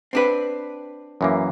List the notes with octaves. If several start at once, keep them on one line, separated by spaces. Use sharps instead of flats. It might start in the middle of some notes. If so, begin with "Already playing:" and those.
C4 D4 B4
F#2 E3 A#3